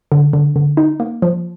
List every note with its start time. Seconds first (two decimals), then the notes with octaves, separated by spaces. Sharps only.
0.12 D3
0.33 D3
0.56 D3
0.77 D#4
1.00 A#3
1.22 F3